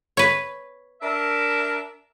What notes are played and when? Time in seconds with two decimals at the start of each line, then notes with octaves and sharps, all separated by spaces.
0.17 B4 C#5
1.01 D4 A#4 E5